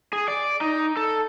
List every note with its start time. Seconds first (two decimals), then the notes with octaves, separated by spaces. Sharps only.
0.13 G#4
0.28 D5
0.61 D#4
0.97 A4